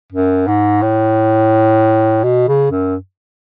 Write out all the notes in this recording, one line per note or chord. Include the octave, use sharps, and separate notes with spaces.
F#2
G#2
A2
B2
C#3
F#2